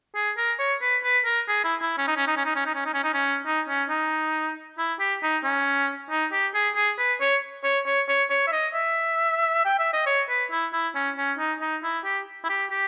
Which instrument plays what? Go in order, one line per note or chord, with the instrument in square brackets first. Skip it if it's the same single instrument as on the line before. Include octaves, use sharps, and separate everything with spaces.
[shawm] G#4
A#4
C#5
B4
B4
A#4
G#4
E4
E4
C#4
D#4
C#4
D#4
C#4
D#4
C#4
D#4
C#4
D#4
C#4
D#4
C#4
D#4
C#4
D#4
E4
G4
D#4
C#4
D#4
G4
G#4
G#4
B4
C#5
C#5
C#5
C#5
C#5
E5
D#5
E5
G5
E5
D#5
C#5
B4
E4
E4
C#4
C#4
D#4
D#4
E4
G4
E4
G4
G4